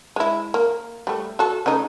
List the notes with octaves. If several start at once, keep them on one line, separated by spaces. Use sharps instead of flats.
G#3 E4
A#3
G3 A3
F#4 A4
C#3 A3 D#4